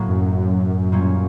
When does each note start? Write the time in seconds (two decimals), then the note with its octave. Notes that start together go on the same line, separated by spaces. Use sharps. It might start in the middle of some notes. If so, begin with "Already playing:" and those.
Already playing: A2 F#3 A#3
0.08 F#2
0.92 A#2 G3 A#3 C#4 F4